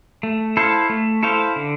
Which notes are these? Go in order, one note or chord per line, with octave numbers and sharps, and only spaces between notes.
A3
E4 A4 C5 F5
A3
E4 A4 C5 F5
D3